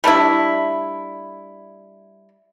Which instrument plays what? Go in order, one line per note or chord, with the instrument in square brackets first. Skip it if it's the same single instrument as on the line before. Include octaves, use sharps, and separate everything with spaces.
[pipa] G3 A3 D4 E4